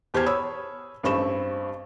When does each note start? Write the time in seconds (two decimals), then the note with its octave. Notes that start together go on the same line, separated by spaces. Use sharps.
0.14 E2 G4 C5 A5 F6 G#6
0.26 C#5 B5 D#6 E6
1.03 A1 G2 C4 B5 C#6 E7